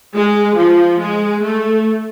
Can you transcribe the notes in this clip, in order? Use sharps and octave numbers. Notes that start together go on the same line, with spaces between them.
G#3
F3
G#3
A3